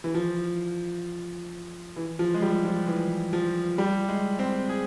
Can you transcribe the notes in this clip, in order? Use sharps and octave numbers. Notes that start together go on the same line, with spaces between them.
E3
F3
E3
F3
G#3
G3
F3
E3
F3
G3
G#3
C4
G#4